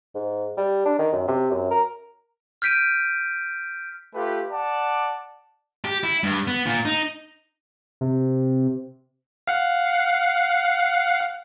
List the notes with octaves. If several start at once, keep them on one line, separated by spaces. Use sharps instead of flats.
G#2
G3
D4
D#3
F#2
C3
F#2
A#4
F6 G6 B6 D7 D#7
A3 F4 G4 B4
D5 F#5 A5
G4
E4
G2
B3
A#2
D#4
C3
F5 F#5